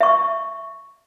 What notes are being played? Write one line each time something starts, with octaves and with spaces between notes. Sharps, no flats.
E5 C#6